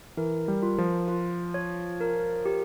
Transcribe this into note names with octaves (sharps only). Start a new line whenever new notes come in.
E3 A#4
G3
F4
F3
F4
C#5
A#4
G4